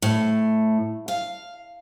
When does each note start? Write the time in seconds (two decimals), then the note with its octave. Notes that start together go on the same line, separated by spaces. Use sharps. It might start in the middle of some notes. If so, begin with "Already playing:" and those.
0.02 A2
1.08 F5